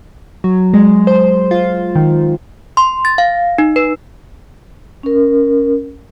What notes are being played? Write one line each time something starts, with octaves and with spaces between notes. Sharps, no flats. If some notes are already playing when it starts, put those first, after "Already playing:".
F#3
G#3
C5
F4
D#3
C6
A6
F5
D#4
B4
C#4 A#4